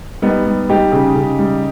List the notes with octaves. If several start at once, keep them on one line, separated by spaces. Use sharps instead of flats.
G3 B3 D#4
G3
G3 D#4 G4
C#3
C#3
G3